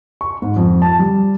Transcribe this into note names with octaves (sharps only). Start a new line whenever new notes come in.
C#6
G#2
F2
A5
G3